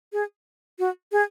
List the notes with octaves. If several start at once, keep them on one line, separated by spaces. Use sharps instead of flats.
G#4
F#4
G#4